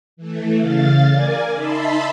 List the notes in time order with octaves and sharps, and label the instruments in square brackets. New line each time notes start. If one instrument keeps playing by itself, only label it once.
[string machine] E3 A3
C#3 F5 A6
A#4 D5 G#5
D#4 E5 A5 B5 C6